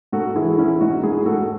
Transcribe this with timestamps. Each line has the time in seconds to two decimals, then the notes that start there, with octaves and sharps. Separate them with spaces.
0.12 G#2 F#4 A4
0.36 E3 E4 G#4
0.57 E3 C#4 E4
0.81 G#2 D#4 F#4
1.03 G#2 E4 G#4
1.26 G#2 F#4 A4